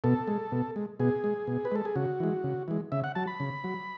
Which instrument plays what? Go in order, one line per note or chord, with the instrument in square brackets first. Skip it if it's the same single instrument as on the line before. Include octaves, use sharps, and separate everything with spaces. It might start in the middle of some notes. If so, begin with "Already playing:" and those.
[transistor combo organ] B2 A4
G#3
B2
G#3
B2 G#4
G#3
B2
B4
G#3 A4
G#4
C#3 F#4
E3 G#3
C#3
E3 G#3
C#3 E5
F#5
F#3 A5
B5
C#3
F#3